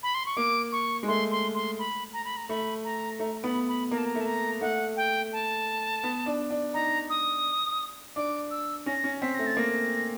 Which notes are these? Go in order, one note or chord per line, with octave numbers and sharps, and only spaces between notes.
B5
C6
C#6
A#3 D6
C#6
G#3
A3 C6
C6
C6
B5
A#5
B5
A#5
A3 B5
A#5
A3 A#5
B3 B5
B5
A#3 A#5
A5
A#5
A3
A5
A#5
A3 F#5
G5
A5
B3
D4
D4
D#4 A#5
D#6
D4 D6
E6
C#4 A#6
C#4
C4 B6
A3 A#6
A6
A#3 A#6